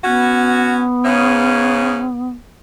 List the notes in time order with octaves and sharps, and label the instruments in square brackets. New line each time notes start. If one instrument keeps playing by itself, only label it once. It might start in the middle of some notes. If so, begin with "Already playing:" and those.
[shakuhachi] B3 [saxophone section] C#4 F#4
[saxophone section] G#2 C#3 C#4